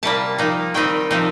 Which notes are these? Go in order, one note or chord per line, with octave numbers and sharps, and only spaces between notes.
C3 G3 A#3 A5
F3 A#3 D#4
D#3 G3 C4 D#4 G5
C3 F3 C4 D#4